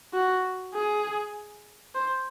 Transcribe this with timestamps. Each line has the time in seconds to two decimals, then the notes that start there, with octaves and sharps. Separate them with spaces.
0.14 F#4
0.75 G#4
1.95 C5